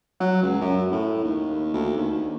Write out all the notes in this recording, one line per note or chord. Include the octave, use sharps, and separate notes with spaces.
F#3
C#2
F#2
A2
D#2
D2
D#2